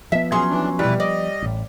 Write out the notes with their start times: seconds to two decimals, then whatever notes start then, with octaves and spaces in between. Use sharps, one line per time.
0.12 F3 B3 E5
0.32 F#3 C#4 G#4 C6
0.49 E3 D4
0.79 E2 B2 G3 E4 B4
1.00 D5 D#5
1.43 A1 A2